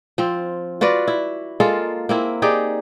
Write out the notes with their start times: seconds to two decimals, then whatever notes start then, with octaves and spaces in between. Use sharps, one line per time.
0.18 F3 C4
0.81 F4 F#4 B4 D5
1.08 E4
1.60 G#3 A#3 F4 A4
2.09 A#3 C4 E4
2.42 D#4 G4 G#4 D5